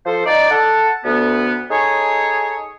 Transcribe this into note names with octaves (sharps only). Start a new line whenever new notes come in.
F3 A4 C5
D#4 D5
A4 F#5 A5
D2 B3
D#4 G#4 A4 C#5